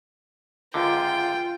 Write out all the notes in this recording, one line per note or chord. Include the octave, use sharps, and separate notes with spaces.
C#2 F#2 D3 F4 G5